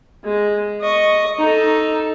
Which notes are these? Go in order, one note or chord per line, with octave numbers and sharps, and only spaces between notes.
G#3
D#5 C#6
D#4 A4